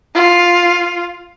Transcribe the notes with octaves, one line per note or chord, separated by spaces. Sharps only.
F4